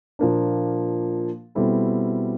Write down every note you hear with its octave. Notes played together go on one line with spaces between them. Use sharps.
A#2 F3 A#3 D4
B2 G3 C4 E4 A4